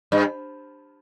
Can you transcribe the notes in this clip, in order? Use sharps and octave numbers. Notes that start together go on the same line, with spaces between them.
G2